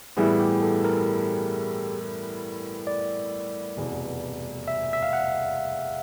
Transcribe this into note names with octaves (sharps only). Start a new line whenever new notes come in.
A2 E3 G3 B3 E4 G#4
G4
A4
A#4
D5
F1 E2 B2
E5
E5
F5
F#5